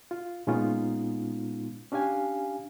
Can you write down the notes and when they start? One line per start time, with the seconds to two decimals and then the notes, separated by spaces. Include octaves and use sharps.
0.11 F4
0.47 A#2 G#3 B3 C#4 D#4 F4
1.92 C#4 D4 G4 F5 G#5